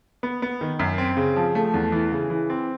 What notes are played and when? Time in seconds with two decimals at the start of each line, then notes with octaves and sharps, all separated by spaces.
0.23 B3
0.42 B3
0.61 D#3
0.79 F#2
0.98 C4
1.17 C#3
1.36 F3
1.55 A3
1.74 E2
1.92 E3
2.12 C#3
2.30 E3
2.50 C4